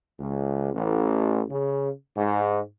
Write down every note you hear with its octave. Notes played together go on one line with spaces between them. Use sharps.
C#2
A1
C#3
G#2